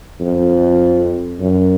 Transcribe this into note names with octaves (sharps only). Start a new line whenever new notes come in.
F2
F#2